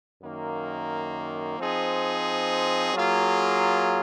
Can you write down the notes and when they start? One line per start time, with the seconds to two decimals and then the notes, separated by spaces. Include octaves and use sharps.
0.23 F#2 D#3 A#3
1.59 F3 C4 D#4 G#4
2.94 F#3 A#3 F4 G#4